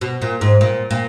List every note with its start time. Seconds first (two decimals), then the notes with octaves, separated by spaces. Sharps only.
0.01 B2
0.22 A#2
0.41 G#2
0.61 A#2
0.91 A#2